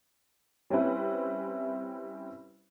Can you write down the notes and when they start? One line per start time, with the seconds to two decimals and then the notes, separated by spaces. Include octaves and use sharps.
0.70 G3 C4 C#4 E4 B4